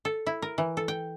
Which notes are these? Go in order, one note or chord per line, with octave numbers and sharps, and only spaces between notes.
A4
E4
A#4
E3
A4
G5